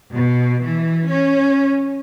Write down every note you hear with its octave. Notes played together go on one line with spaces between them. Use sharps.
B2
E3
C#4